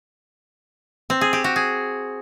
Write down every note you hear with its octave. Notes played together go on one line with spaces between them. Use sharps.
C4
G#4
G4
F#4
G#4